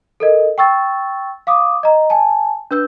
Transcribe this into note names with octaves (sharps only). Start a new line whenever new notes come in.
A4 A#4 D#5
G5 C#6 E6 A6
F5 D6 D#6
D#5 A#5
G#5 A5
D4 B4 E6 G6